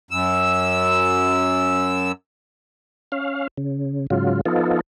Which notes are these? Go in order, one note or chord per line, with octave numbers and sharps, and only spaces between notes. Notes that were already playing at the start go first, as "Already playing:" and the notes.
F#2 E6
C#4 F5
C#3
G#2 C#3 F#3 F4
F3 B3 D#4 F4 A4